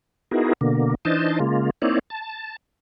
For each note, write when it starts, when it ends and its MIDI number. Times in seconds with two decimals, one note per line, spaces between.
0.31 0.53 59
0.31 0.53 63
0.31 0.53 64
0.31 0.53 66
0.31 0.53 68
0.31 0.53 70
0.61 0.95 47
0.61 0.95 50
0.61 0.95 58
1.05 1.39 52
1.05 1.39 62
1.05 1.39 63
1.05 1.39 72
1.05 1.39 75
1.05 1.39 81
1.40 1.70 49
1.40 1.70 56
1.40 1.70 58
1.40 1.70 65
1.82 1.99 58
1.82 1.99 60
1.82 1.99 63
1.82 1.99 64
1.82 1.99 73
1.82 1.99 74
2.10 2.56 81